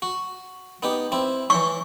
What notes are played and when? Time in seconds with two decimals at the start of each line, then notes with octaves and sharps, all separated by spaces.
0.02 F#4
0.83 B3 D#4 G4
1.12 C4 E4
1.50 E3 C#5 C#6